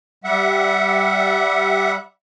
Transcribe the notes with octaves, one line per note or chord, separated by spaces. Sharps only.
G3 E5 F#5